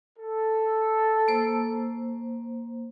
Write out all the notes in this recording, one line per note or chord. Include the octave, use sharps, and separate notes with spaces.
A4
A#3 C5